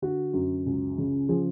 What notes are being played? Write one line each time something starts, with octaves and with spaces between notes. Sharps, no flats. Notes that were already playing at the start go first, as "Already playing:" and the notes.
D3 F#4
F#2
C#2
C#3
F3 G#4